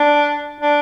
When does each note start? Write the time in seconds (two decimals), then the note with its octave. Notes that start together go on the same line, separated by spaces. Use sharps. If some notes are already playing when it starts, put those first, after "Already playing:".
Already playing: D4
0.61 D4